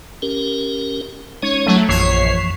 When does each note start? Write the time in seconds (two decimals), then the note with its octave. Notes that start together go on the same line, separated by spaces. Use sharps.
0.22 C#4 G4 A#4
1.43 G#3 C#4 D#4 C#5
1.66 F#3 A3
1.89 A#1 F#2 E3 F3 C#5 C7